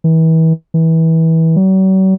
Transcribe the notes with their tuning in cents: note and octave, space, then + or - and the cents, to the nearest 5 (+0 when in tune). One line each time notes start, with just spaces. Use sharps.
E3 -35
E3 -25
F#3 +45